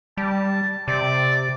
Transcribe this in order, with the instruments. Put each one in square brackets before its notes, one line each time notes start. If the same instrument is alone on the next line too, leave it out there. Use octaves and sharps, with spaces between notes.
[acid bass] G3 [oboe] A5
[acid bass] C3 [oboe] D5